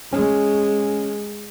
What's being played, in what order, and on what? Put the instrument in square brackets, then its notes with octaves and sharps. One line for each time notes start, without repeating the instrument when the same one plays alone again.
[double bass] G#3 [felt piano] C#4